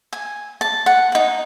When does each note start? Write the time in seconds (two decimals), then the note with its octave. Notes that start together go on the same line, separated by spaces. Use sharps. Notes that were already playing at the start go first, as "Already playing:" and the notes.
0.13 G#5
0.61 A5
0.86 F#5
1.12 D#4 F#5